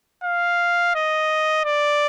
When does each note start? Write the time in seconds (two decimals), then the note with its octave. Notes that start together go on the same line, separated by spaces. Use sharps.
0.24 F5
0.96 D#5
1.65 D5